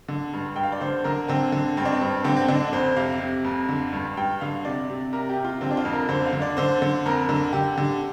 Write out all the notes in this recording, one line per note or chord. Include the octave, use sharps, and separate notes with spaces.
D3
G2
G2 G5
F5
D5
D3 C5
D3 A#4
D3 C4
D3
G2 C4
D4
C4
G2
D3 C4
C4
D3 D4
D4
F2 C5
C3 F5
C3
F2
D3
G2
G2 G5
D3 F5
C3 D5
C3
C3 A#4
G4
C3
F4
D3 C4
D4
F4
F2
A#4
D3 C5
F5
D3
D5
D3 C5
D3
F2 A#4
D3
D3 G4
D3